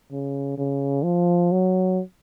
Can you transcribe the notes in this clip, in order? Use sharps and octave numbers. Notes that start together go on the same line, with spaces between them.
C#3
C#3
F3
F#3